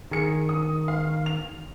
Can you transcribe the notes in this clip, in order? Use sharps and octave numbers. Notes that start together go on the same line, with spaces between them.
D#3 G#4 C#7
D#6
F5
F7